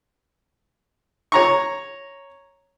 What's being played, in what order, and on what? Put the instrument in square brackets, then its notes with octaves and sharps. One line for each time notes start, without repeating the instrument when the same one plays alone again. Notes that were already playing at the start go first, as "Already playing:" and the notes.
[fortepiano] C#5 A#5 C#6